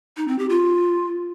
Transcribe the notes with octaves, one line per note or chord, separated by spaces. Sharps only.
D#4
C4
G4
F4